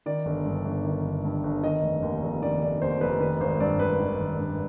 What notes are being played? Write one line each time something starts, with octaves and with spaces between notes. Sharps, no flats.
D#3 D5
G1
G2
G1
D#3
G1
G2
G1
D#3 D#5
F1
D#2
F1
D#3 D5
F1 D5
D#2 C5
F1 B4
D#3 B4
G#1 C5
G2 D5
G#1 B4
D#3
G#1
G2